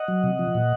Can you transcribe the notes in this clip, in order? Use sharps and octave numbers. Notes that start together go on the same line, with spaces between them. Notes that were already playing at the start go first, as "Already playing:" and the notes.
Already playing: D#5 F#5
F#3
C3
F3
A#2